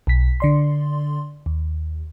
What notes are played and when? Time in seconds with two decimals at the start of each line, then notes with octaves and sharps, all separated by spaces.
0.07 B1 B6
0.40 D3 D5 C6
1.46 D#2